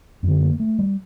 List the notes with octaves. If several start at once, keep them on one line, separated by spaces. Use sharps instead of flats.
F#2 D3 C4
A#3
A3
G3